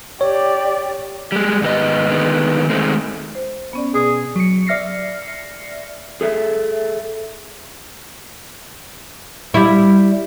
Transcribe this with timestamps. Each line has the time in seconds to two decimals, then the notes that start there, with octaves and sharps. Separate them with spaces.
0.21 G4 C#5 D5
1.32 G3 G#3
1.62 G#2 D#3 B3 D#5
2.10 D3 D#3 G#3 B3
2.69 D#3 G#3 A3 C4
3.35 C5
3.73 B3 C#4 D5
3.94 B2 G#4
4.36 F#3 C#7
4.67 D5 E5 F6 A#6 C7 C#7
6.21 G#4 A4 E5
9.54 G3 E4